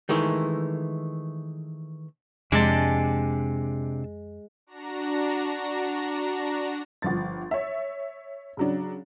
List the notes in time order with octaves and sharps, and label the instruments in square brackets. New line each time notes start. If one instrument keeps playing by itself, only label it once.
[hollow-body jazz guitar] D#3 E3 G#3 A3
[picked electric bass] F2 [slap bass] C3 [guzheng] G#3 [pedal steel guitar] D4 A5
[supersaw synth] D4 F#4 A#5 A#6
[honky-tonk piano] G1 F3 A6
C#5 E5
C#3 F#3 D4